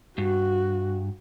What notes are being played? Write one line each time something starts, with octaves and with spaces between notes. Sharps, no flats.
G2 F#4